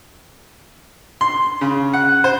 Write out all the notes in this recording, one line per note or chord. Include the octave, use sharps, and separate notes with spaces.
C6
C#3
F#5
C5